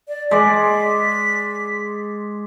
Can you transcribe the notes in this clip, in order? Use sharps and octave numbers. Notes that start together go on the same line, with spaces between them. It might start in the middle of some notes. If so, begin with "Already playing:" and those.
D5
G#3 D5 B6